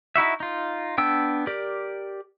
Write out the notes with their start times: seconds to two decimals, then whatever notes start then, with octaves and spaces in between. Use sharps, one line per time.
0.16 D#4 E4 F#4 E5
0.40 D#4 F4
0.98 B3 D4 G5 E6
1.47 G4 A#4 D5